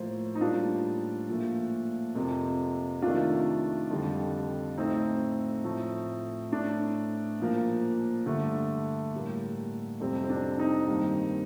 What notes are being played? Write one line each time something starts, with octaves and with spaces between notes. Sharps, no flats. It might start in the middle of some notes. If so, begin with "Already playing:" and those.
Already playing: A2 F3 A#3 C5
D#4
A2 G3 A#3 D4 F4
A#2 F3 A3
F2 C3 F3 A#3
C3 D#3 A3 D4 F4
F2 D3 G3
A2 A3 C4 D#4
A2 F3 A3
A2 A3 D4
A#2 F3 A#3
G2 D3 A3
A2 G3 A#3
F2 C3 G3 C4
C4
D4
C4 D#4
G2 D#3 G3 A#3